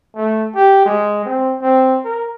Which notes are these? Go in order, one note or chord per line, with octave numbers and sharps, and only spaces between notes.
A3
G4
G#3
C4
C4
A#4